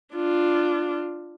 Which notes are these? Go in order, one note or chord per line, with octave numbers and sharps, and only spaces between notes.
D4 F4